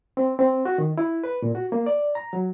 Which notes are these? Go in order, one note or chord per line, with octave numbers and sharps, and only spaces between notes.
C4
C4
F#4
D#3
E4
B4
A#2
F#4
A#3
D5
A#5
F#3